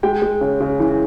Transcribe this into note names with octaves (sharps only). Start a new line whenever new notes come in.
G#3 G5
G#3
C#3
C#3
E3